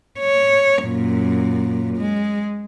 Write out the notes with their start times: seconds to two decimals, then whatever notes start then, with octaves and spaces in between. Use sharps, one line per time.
0.19 C#5
0.83 F#2 A#2
1.98 G#3